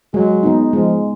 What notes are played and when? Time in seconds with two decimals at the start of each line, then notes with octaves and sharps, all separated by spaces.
0.14 F#3 G#3
0.43 B3 D#4
0.73 F3 G#3